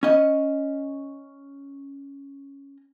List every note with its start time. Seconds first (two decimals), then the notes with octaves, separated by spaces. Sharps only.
0.03 C#4 D#5